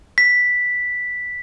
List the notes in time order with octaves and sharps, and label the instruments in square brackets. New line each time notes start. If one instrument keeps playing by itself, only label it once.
[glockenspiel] B6